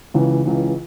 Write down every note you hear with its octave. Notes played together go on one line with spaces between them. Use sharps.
C#2 C#3 E3
C#2 C#3 E3